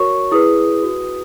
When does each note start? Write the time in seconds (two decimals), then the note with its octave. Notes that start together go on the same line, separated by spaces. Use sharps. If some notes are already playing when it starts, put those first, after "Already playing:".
Already playing: F#4 A#4 C#5 C#6
0.31 E4 G#4 B4 D#6
0.83 F#4 B4